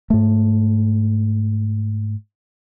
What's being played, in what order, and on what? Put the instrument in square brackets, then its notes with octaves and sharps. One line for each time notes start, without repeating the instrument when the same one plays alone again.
[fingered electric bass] G#2 A3